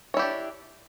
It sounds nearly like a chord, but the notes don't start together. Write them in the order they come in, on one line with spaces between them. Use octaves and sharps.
C#5 E4 G4 D4